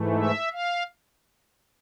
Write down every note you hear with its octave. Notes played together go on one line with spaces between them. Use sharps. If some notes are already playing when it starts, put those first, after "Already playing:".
Already playing: G#2 E3 A3
E5
F5